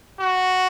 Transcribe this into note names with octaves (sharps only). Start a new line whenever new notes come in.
F#4